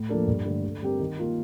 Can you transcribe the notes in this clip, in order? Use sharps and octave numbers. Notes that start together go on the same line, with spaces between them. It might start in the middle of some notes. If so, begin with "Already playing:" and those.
Already playing: A2
F3 A#3 D4 A4
G2
D3 A3
D3
G3 C4 G4 A#4
D#3
A#3 F4 A#4